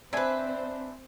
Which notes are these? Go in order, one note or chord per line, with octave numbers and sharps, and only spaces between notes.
C4 D4 B4 C5 E5 G#5